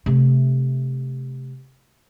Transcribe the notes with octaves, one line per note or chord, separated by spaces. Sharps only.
C3 A3